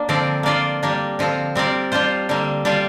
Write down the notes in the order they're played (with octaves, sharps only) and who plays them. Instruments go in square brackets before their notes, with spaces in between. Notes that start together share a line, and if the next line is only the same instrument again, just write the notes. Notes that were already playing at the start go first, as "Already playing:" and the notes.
Already playing: [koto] A#3 D4
D3 F3 C4 A#4 D5
A#3 D4 F4 A#4 D5
G3 A#3 D4
D3 F3 C4 F4
G3 C4 A#4 D5
G3 D4 F4 C5
D3 G3 A#3
G3 D4 F4 D5